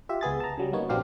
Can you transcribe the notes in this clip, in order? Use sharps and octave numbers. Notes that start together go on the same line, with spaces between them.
F4 G4 E5
C#2 B3 G#4 A6
A5 A#5
C#3 F#3 G3
A#3 B3 D#4 C#5
A#1 F#3 C4 D4 G4 F5